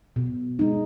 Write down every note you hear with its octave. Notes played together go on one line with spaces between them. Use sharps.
B2
G#3 D#4